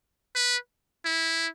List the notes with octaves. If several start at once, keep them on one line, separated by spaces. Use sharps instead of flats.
B4
E4